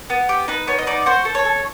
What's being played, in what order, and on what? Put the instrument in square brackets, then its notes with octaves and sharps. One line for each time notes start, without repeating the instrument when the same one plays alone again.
[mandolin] B3
G4
D#4 B4
B3 C#5
D#5
D#4 D5
F#4 C5
A4
C#5
A4